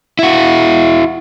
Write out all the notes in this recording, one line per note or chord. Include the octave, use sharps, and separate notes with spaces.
E4 F#4